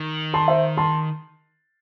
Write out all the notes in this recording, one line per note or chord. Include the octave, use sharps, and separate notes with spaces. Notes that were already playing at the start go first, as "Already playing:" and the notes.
Already playing: D#3
A5 C6
C5 E5
A5 C6